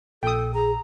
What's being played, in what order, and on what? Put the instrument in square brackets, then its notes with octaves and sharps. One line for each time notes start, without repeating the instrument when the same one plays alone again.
[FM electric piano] A#1 A#2 [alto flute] A4 [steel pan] G5 D#6
[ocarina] G#4 [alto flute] A#5